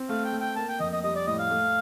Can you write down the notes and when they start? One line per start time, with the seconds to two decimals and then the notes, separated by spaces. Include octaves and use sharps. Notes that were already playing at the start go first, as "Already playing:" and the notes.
Already playing: C4
0.09 A3 F5
0.25 G5
0.33 A3
0.40 G5
0.56 A#3 A5
0.68 G5
0.80 F2 D#5
0.92 D#5
1.03 G3 D#5
1.15 D5
1.27 A2 D#5
1.39 F5
1.50 A3